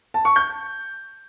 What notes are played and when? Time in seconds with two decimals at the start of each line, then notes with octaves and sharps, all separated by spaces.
0.14 A5
0.25 C#6
0.36 G6